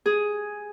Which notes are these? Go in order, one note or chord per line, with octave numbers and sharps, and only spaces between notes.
G#4